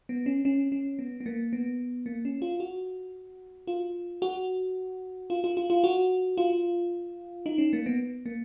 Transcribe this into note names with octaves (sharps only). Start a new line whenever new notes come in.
B3
C#4
C#4
C#4
B3
B3
A#3
B3
A#3
C#4
F4
F#4
F4
F#4
F4
F4
F4
F4
F#4
F4
D#4
C#4
A#3
B3
A#3